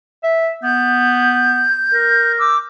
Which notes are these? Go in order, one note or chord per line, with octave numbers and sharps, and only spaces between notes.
E5
B3 G6
A#4
D6 E6